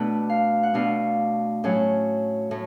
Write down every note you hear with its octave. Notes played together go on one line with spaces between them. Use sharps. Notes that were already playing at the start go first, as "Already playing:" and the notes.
Already playing: B2 A3 D4 B4
F5
F#5
B2 A3 D4 F5
A2 F#3 C#4
A2